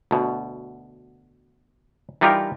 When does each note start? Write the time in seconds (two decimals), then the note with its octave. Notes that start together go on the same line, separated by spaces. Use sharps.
0.11 D2 B2
2.21 E3 G3 D#4 F4 G4 A#4